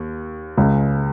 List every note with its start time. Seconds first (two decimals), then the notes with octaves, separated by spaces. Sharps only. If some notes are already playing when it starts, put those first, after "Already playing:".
Already playing: D#2
0.57 C#2 C#3 G#3